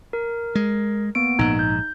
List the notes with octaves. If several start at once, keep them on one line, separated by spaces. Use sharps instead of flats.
A#4
G#3
A#3 B3 D7
A#1 G#2 D#4
G6